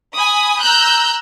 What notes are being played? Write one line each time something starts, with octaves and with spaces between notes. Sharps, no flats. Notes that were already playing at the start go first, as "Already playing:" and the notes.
G#5 B5 D#6
A#5 E6 F#6 G6